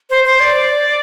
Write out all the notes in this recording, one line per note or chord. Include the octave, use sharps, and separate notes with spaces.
C5
C5
D5